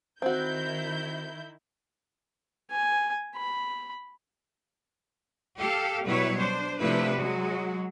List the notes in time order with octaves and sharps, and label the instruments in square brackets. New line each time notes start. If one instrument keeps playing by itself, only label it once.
[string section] D#3 E4 G6 [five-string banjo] C4 F#4
[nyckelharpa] G#5
B5
[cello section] G4 A4 F5
B2 F#3 G3 E4 B4 C#5
D4 C5
C3 F3 A3 D4 E4 B4
F#3 G#3 F#4